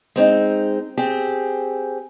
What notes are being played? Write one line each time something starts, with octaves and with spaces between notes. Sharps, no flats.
G#3 C4 C#4 D#4
C4 G4 G#4